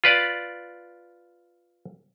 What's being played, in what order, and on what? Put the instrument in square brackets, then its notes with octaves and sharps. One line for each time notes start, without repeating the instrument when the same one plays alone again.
[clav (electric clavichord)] F4 B4 D5